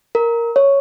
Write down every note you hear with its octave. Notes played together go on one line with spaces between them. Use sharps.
A#4
C#5